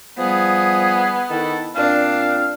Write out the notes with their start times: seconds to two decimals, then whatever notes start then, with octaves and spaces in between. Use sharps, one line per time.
0.18 F3 G3 B3 G#4
1.29 D#3 E4 A4
1.75 A#2 C4 D4 F5